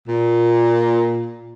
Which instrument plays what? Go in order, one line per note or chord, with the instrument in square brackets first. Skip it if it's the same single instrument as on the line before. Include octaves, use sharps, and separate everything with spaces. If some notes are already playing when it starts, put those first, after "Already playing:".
[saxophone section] A#2